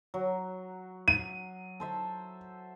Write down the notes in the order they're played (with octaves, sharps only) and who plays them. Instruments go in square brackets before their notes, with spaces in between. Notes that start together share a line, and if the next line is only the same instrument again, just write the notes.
[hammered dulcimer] F#3
[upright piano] D#7
[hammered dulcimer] A4 C5 E5